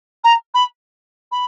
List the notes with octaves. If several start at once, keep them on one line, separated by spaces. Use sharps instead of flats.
A#5
B5
B5